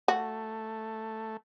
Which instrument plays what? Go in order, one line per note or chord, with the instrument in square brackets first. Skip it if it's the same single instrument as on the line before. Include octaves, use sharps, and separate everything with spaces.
[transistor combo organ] A3 [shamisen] F#4